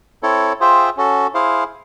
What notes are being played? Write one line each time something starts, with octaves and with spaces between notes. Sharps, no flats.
C4 E4 A4 C#5
F4 G#4 C5 E5 G5
C#4 F#4 A4
E4 G#4 C5 F5